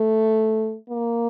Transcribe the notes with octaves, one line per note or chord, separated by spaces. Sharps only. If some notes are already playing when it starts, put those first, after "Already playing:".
Already playing: A3
A#3